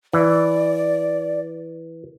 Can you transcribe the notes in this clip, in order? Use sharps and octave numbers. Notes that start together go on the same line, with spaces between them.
E3 D5